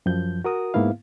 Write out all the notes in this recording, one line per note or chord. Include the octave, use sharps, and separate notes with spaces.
F#2 F3 G6
F#4 A#4 D#6
G#2 A#3 B3 E4 F5